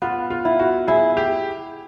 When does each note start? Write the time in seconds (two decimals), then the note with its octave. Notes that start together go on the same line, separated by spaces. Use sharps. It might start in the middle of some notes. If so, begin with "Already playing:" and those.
0.02 B3 F4
0.30 F4
0.45 E4
0.59 F#4
0.87 E4 G#4
1.17 G4